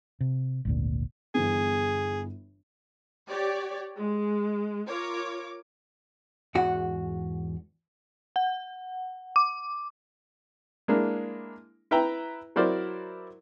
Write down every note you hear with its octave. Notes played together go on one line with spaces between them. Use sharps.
C3
G#1 D2 A#2
G1 E3 B3 G#4
G4 C#5 D5
G#3
F4 A#4 C#5 D6
E2 G#2 F#4 F#5
F#5
D6
G#3 A#3 D4 E4
E4 B4 E5 G5 A#5
F#3 E4 A#4 C5 D5